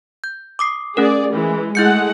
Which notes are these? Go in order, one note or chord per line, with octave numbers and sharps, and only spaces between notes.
G6
D6 D#6 C7
A3 C#4 G#4 A#4 D5
E3 G#3
G#3 A3 E4 F#5 G6 C#7